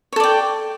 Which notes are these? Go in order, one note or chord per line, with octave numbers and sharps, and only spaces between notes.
A4 C#5 D5 G5